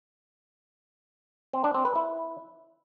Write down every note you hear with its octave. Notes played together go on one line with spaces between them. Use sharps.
C4
D4
C4
B4
E4